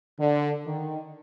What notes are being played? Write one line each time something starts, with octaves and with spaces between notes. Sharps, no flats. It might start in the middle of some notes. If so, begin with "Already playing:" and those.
D3
D#3